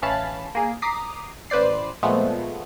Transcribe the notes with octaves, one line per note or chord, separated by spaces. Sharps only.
A1 E3 C#4 F5 A5 B5
A#3 G#4
A#5 D6 D#6 B6 C7
A1 B4 C5 D5 C7
A#2 F3 G#3 A3 B3